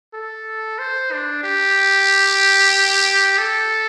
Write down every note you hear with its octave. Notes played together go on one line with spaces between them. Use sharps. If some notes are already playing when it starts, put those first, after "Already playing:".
A4
C5
D4
G4
A4